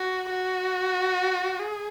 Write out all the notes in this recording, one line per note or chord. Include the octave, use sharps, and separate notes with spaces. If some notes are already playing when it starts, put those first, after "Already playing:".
Already playing: F#4
F#4
G#4